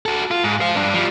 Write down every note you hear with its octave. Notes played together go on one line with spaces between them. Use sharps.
F#4 A4
F4
G#2
C5 F5
G2 D4
F3 G3